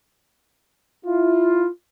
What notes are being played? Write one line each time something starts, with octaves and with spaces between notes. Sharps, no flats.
E4 F4